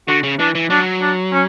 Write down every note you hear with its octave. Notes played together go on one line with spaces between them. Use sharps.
D3 F#4
C#3
E3 D4
E3
F#3 D4
D4
C#4